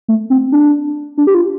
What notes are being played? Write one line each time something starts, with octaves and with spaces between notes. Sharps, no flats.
A3
C4
D4
D4
G4
F4